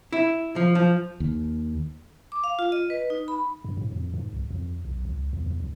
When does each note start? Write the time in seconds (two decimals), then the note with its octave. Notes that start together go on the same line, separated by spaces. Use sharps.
0.13 E4
0.56 F3
0.75 F3
1.20 D#2
2.32 D6
2.44 F5
2.59 F4
2.72 D#5
2.90 B4
3.10 D#4
3.28 B5
3.64 G2
3.77 A2
3.92 F2
4.14 G#2
4.33 C2
4.50 F2
4.85 B1
5.05 C#2
5.33 E2
5.46 E2
5.60 D2